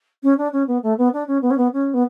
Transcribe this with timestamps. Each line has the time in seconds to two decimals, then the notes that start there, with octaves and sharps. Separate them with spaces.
0.23 C#4
0.38 D4
0.53 C#4
0.67 B3
0.83 A3
0.98 B3
1.13 D4
1.27 C#4
1.42 B3
1.51 C#4
1.57 B3
1.73 C#4
1.94 B3